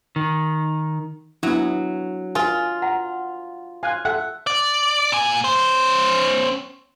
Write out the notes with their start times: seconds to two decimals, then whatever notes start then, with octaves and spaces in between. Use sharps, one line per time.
0.16 D#3
1.43 F#3 B3 D4 E4
2.35 F4 A#4 G#5
2.82 F#5 A#5
3.83 F5 G#5 F#6
4.05 A4 E5 F#5
4.47 D5
5.12 A#2 G#5
5.44 C#4 C5